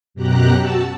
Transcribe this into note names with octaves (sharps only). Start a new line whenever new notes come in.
F#2 B2 G4 A#5 F#6
F#4 A5 E6